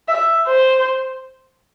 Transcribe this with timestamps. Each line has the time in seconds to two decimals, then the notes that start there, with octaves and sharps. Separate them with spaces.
0.08 E5
0.47 C5